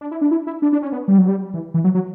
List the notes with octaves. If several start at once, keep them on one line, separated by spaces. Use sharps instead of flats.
D4
E4
D4
E4
E4
D4
D4
C#4
B3
G3
F#3
G3
E3
E3
F#3
F#3